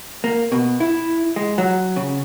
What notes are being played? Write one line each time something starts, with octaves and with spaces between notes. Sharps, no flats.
A#3
B2
E4
G#3
F#3
C#3